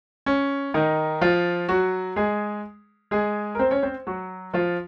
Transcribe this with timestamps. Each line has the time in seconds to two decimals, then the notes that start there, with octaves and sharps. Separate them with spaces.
0.26 C#4
0.74 D#3 D#4
1.21 F3 F4
1.69 F#3 F#4
2.16 G#3 G#4
3.11 G#3 G#4
3.55 A#4
3.59 C4 C5
3.71 C#4 C#5
3.83 C4 C5
4.07 F#3 F#4
4.54 F3 F4